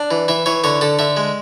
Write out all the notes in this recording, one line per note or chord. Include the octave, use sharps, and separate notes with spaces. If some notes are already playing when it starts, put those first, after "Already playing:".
Already playing: D4
E3
E3 E5
E3 C#5
D3 C#5
D3 A4
D3 E5
G#3